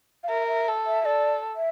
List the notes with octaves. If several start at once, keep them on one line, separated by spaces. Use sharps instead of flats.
F5
A#4 E5
E5
A4
E5
A4 D5
E5